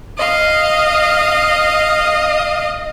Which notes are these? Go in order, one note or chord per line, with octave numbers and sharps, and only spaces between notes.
D#5 F5